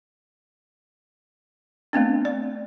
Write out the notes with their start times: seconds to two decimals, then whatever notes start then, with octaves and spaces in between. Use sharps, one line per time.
1.93 A3 B3 C4 D4
2.25 D5